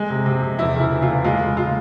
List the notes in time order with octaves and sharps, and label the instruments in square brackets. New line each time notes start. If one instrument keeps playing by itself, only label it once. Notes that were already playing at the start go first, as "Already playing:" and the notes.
Already playing: [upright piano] G#3
C3
C3
C3
E2 E4
C#3 E4
E3
F4
E2
G#3 F4
C#3
G#3 F4